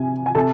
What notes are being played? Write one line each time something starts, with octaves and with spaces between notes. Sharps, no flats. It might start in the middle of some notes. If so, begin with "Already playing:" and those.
Already playing: C3 G#5
G#5
C3 A4 A5